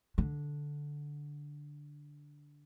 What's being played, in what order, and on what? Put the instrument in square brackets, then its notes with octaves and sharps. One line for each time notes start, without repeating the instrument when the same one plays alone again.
[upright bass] D3